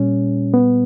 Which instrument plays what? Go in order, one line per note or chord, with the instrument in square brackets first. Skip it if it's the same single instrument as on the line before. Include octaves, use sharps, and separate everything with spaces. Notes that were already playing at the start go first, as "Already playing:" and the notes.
Already playing: [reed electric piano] A#2 G3 C#4
B3